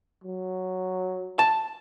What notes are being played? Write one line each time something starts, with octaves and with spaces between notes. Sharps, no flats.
F#3
A5